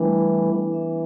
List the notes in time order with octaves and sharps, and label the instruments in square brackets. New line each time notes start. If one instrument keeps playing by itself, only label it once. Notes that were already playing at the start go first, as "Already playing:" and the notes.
Already playing: [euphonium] E3 [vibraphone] G3 A3 D4
[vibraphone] A4
B3
[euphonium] E3 [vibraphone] D4
[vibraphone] E5